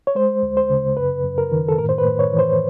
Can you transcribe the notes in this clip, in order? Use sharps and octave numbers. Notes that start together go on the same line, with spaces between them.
C#5
G#3 C5
D2
C5
C#3
F#2 B4
F#2
A#4
D#3
A4
A2 A#4
C5
B4
A2
C#5
E3
C5